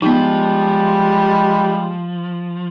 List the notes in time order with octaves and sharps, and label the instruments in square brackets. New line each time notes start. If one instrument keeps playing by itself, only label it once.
[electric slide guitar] F3 [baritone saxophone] G3 [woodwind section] G#3 [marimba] B3 D#4